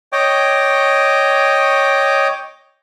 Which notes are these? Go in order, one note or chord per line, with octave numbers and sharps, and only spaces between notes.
C#5 D#5 G5 D6